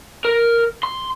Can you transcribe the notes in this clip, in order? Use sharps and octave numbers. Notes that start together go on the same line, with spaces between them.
A#4
C6